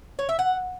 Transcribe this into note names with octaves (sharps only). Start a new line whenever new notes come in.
C#5
E5
F#5